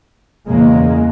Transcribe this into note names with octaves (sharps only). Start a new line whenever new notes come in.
E2 C#3 G#3 A#3